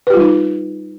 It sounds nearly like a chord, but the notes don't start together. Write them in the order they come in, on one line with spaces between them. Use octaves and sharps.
B4 G4 F4 G3 D#4